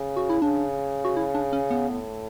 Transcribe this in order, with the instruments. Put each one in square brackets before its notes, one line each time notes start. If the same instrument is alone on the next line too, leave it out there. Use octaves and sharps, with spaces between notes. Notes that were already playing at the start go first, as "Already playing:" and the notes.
Already playing: [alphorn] C#3
[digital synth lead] F#4
E4
[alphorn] C#3 [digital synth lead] D4
[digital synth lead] F#4
E4
D4
C#4
B3
[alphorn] A2